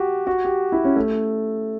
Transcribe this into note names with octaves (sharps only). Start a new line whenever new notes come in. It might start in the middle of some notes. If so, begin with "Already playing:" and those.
Already playing: F#4 G4
F#4
G4
E4
C#4
A3